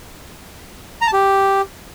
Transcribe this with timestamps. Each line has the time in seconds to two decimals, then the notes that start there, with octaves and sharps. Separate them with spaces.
1.01 A#5
1.07 A5
1.13 G4